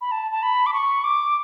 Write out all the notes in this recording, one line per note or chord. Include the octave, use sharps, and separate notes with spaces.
B5
A5
A5
B5
D6
C#6
D6